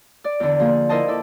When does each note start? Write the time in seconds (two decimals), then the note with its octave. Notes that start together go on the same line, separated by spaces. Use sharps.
0.24 D5
0.40 E2 D3
0.60 F3 A#3 G#4
0.89 E4 A#4 C5 D#5 A5
1.08 E4 A4 D5